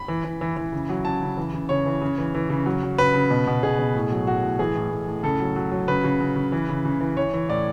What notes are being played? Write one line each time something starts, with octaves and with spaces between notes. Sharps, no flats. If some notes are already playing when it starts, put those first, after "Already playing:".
Already playing: B5
E3
E3
E3
E3
C#3
F#3
C#3 A5
C#3
E3
C#3
C#3 C#5
E3
C#3
E3
E3
C#3
F#3
F#3
C#3 B4
C#3
B2
B2
B2 G#4
B2
A2
F#3
A2 F#4
A2
E3 G#4
A2
A2
A2
C#3 A4
F#3
F#3
F#3
C#3 B4
C#3
C#3
C#3
E3
C#3
C#3
E3
E3 C#5
E3
A2 D5